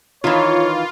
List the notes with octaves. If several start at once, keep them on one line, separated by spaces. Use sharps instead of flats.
D#3 E3 F4 C#5